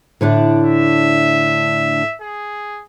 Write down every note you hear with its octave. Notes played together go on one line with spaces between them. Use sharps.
A2 D3 D4
E5
G#4